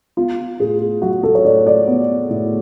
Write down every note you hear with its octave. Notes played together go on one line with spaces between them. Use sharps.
B3 F4
A2 G#4
F#3 F#4
A4
C#5
A2 D5
D5
B3
A2